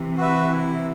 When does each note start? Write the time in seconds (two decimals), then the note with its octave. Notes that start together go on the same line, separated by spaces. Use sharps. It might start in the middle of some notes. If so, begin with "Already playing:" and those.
Already playing: C3 E3
0.18 F#4 B4 E5
0.52 E4